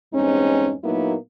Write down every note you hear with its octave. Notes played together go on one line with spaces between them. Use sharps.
E2 G2 G#3 C4 C#4 D#4
A#2 F#3 A#3 B3 D#4 E4